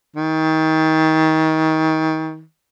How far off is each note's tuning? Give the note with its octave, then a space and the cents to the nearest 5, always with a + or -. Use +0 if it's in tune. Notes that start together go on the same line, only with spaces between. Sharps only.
D#3 +30